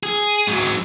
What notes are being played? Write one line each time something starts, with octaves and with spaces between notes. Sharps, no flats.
G#4
G#2 F#3